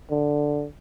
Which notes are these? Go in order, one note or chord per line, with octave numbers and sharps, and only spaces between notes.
D3